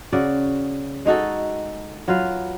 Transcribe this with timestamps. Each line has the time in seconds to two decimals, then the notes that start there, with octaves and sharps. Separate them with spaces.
0.12 C#3 F#4 D5
1.05 G#3 D#4 F#4 A4
2.08 F#3 F4 B4 F5